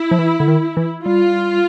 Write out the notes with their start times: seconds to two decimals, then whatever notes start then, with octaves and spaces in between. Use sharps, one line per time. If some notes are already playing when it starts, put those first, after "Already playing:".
Already playing: E4
0.11 F3
0.19 E3
0.40 D3
0.48 D#3
0.77 E3
1.06 G3 F4